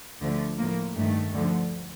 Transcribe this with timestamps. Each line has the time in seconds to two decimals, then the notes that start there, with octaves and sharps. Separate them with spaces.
0.22 D2 D3 F3 A3
0.59 A2 F3 A#3
0.96 G2 D#3 A3
1.33 D2 D3 F3